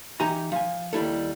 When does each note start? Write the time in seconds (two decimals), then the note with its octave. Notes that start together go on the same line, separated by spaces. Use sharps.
0.20 E3 D#4 G4 G#5 A#5
0.52 F3 G#5
0.93 D#2 G3 E4 A4